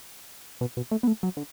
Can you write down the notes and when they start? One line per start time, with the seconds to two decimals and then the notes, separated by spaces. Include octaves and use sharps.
0.61 B2
0.77 B2
0.91 A3
1.03 B3
1.07 A3
1.23 F#3
1.37 D3